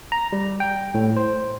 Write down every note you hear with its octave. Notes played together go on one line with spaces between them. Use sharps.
A#5
G3
G5
A2
C5